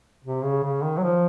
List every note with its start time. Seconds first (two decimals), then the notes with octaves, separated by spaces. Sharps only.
0.24 C3
0.44 C#3
0.64 C#3
0.83 D#3
0.98 F#3
1.03 F3